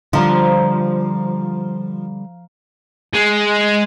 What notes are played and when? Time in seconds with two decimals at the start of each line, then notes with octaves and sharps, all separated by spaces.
0.13 D3 F3 G3 F5 A#5
3.13 G#3